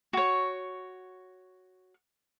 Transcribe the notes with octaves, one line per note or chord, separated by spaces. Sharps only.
F#4 C#5